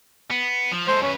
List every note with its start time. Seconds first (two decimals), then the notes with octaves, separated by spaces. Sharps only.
0.31 B3
0.72 F3
0.88 G#3 A4 C5
1.02 F#2 C#4 B4